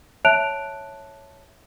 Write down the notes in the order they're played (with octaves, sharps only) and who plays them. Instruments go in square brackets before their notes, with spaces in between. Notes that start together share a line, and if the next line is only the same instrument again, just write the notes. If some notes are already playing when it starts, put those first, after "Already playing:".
[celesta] C#5 E5 A5 F#6 D7 F7